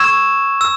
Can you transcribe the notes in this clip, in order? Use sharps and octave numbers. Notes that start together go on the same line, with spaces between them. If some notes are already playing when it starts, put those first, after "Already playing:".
Already playing: C#6 E6 G#6 E7
E6